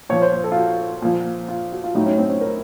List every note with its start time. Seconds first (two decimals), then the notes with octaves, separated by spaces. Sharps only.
0.10 A#2 F3 C#5
0.22 C5
0.33 C5
0.44 A4
0.52 F4
0.56 F#4
1.02 A#2 F3
1.48 F4
1.72 F#4
1.84 F4
1.95 A2 F#3 D#4
2.06 C#4
2.18 C4
2.30 C#4
2.41 A#4